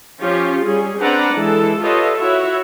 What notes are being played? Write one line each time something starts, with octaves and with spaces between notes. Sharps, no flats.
F3 C#4 F4 G4
G3 C#4 G#4
C4 D4 B4 D5 F#5 A#5
E3 G#3 A4
F4 G4 A4 B4 C#5 D#5
E4 F#4 C#5 E5